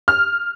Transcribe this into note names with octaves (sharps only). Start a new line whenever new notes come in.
F6